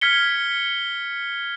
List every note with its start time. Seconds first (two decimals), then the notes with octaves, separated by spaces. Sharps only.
0.01 F6 G#6 B6 C#7 G7